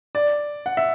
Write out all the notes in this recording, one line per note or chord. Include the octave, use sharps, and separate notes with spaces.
D5
F#5
E5